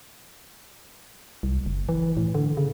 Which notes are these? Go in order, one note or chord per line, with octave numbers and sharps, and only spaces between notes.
C2
F#1
E3
A2
D3
C#3